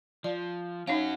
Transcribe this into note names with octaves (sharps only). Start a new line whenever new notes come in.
F3 D5
C#4 D#4 F#4 C#5 F5